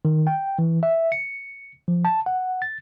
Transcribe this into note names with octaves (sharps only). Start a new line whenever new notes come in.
D#3
G5
E3
E5
C#7
F3
A5
F#5
A6